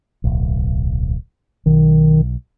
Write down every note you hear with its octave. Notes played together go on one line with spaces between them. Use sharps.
D1 B1
B1 D#3